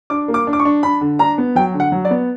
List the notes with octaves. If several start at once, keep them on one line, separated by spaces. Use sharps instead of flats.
D4 D6
A#3
D6
D4
D6
C#6
D4
D4 B5
D3
D4 A#5
B3
F#3 G5
D3
F#5
F#3
D5
B3